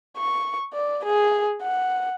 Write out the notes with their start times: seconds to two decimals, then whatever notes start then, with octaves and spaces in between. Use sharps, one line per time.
0.17 C#6
0.73 D5
1.05 G#4
1.62 F#5